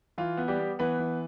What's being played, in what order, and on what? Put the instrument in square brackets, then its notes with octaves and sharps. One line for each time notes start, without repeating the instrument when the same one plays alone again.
[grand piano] E3 F4
B3
G3 G4
B3
E3 B3 B4
E3